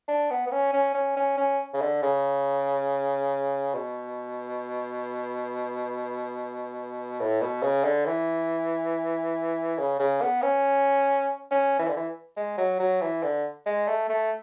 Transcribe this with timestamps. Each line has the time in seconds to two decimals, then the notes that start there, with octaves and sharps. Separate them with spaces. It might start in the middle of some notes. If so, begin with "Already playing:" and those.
0.08 D4
0.30 B3
0.47 B3
0.51 C#4
0.73 C#4
0.94 C#4
1.16 C#4
1.37 C#4
1.74 C#3
1.81 D3
2.02 C#3
3.74 B2
7.20 A2
7.41 B2
7.62 C#3
7.84 D3
8.06 E3
9.78 C#3
9.99 C#3
10.22 B3
10.42 C#4
11.51 C#4
11.79 E3
11.88 D3
11.96 E3
12.37 G#3
12.58 F#3
12.80 F#3
13.01 E3
13.23 D3
13.66 G#3
13.88 A3
14.09 A3